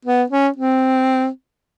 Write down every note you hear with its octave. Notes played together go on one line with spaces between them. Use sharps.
B3
C#4
C4